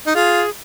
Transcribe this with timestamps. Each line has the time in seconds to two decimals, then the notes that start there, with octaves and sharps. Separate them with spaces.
0.06 D#4
0.14 F4 G#4